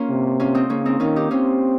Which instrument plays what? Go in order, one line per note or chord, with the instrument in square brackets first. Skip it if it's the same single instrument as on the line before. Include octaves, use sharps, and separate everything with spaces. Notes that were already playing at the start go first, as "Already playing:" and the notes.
Already playing: [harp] A#3 C#4 F4
[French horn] C3
[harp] C#4 F4
C4 D#4
[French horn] C#3 [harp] A#3 C#4
[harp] C4 D#4
[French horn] D#3 [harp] C#4 F4
[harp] D#4 G4
[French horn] C4 [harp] C#4 F4